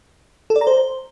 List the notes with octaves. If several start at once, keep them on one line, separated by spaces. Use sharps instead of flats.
A4
D5
A#5
C5